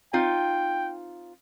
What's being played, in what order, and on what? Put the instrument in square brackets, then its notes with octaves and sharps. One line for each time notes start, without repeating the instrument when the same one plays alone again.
[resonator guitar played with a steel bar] C4 D#4 F4 [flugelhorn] G5